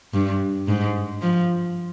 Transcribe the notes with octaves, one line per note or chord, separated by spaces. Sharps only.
G2
G#2
F3